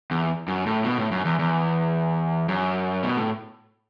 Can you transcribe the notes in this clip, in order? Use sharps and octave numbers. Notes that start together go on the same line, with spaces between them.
E2
F#2
A2
B2
A2
F#2
E2
E2
F#2
B2
A2